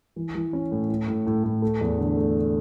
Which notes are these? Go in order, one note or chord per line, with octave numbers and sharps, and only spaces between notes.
E3
E3
C#4
A2
A2
A2
A2
A2
A3
E2
D3
A3